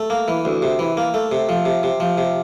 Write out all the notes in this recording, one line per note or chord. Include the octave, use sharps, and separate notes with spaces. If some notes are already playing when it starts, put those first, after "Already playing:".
Already playing: A3
A#3
E3
D2
C3
E3
A#3
A3
C3
F3
C3
C3
F3
C3